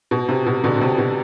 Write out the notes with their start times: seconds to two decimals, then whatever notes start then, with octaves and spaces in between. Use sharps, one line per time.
0.11 B2
0.29 C3
0.46 B2
0.64 B2 D3
0.77 B2
0.81 C3
0.98 B2